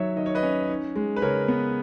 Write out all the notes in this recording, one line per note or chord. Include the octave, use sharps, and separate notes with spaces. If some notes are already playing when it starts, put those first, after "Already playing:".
Already playing: D#3 F#3 C#5 E5
D#3 D#5
C#5
B4 D#5
C#4
D#4
G#3
B4
C#3 A#4 C#5
B3